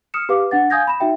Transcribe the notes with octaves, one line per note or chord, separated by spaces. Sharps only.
D#6 F6 C#7 E7
G4 B4 F5 D6
D4 F#5 A6
F5 G#5 D#6 G6 G#6 A#6
B5 E7
D#4 F#4 E5 G5